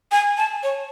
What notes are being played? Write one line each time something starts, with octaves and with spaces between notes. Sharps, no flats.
G#5
A5
C#5